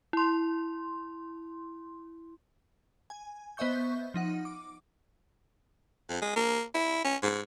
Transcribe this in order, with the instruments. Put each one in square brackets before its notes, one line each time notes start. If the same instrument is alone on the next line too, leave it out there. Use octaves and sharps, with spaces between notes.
[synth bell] E4 C6
G#5
B3 C5 D#5 E5 C#6 G6
F3 D#4 F#5
D6
[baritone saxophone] F2
G#3
A#3
E4
C#4
G#2